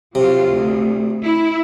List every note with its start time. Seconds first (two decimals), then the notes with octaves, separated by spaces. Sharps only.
0.15 C3 F#3 F4
0.48 D2
1.23 E4